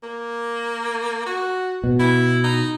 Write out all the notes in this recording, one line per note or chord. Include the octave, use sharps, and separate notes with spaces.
A#3
F#4
B2
E4
D#4